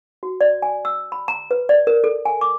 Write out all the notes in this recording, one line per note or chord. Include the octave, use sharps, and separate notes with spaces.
F#4
D5
G#5
E6
B5
A#5
B4
D5
A#4
A4
G#5
D6